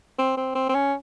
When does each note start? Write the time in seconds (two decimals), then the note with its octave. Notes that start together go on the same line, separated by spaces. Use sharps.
0.19 C4
0.37 C4
0.55 C4
0.69 C4
0.74 C#4